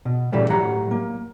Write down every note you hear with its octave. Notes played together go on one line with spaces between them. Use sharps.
B2
A#2 C#3 E3 G3 A3
A2 F#3 G4 F#5 A#5
A#3